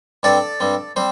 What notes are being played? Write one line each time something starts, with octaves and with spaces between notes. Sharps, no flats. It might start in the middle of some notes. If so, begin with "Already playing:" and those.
G2 G3 C4 A4 D5
G2 G3 C4
G3 C4 C5